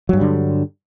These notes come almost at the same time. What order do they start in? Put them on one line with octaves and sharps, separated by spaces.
F#3 G2 G3 D3